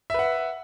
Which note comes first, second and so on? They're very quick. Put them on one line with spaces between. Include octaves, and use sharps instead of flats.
E5 B4 F#5